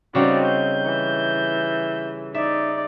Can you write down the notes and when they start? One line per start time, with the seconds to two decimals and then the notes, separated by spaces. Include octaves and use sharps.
0.15 C#3 G3 C4 D#4 F#4 D5
0.47 G6
0.85 E3
2.34 D#4 D5 E5